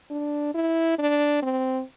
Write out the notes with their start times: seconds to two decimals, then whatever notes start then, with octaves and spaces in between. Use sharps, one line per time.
0.10 D4
0.54 E4
0.99 D4
1.42 C4